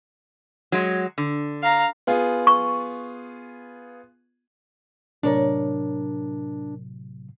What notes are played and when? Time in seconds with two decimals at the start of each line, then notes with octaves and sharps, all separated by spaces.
0.72 F#3 G#3
1.18 D3
1.63 F5 A#5
2.07 B3 F4 G#4
2.47 C#6
5.23 A2 C3 F#3 D4 A#4 C#5 D5